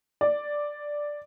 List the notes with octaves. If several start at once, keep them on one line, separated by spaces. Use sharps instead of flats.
D5